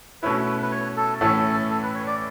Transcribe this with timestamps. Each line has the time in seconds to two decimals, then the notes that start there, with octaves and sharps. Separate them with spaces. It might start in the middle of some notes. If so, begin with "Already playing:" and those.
0.22 B2 A3 C#4 E4 B4
0.62 B4
0.71 C#5
0.97 A4
1.21 A2 E3 A3 C#4 A4
1.70 A4
1.82 B4
1.95 C#5
2.07 D5